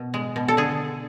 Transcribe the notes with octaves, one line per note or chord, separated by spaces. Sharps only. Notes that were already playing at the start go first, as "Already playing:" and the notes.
Already playing: B2
G#3
B2
A4
D3 G#4